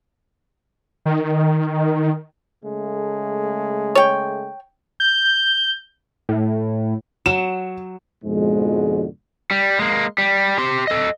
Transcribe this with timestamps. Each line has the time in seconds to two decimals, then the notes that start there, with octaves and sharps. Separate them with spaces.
1.06 D#3
2.65 C#3 G#3 A3
3.95 C#5 G5
5.00 G6
6.29 A2
7.26 F#3 E7
8.25 F2 G#2 B2 D3 F3 G#3
9.51 G3
9.79 G#3 A#3
10.18 G3
10.58 G4 C6
10.87 A4 D#5